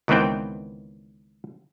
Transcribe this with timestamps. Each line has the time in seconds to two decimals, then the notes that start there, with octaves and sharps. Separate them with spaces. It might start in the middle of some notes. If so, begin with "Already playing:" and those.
0.08 C#2 D#3 E3 B3 C4 G5